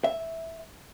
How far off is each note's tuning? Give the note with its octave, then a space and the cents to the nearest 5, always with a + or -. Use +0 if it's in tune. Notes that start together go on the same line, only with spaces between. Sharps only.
E5 -5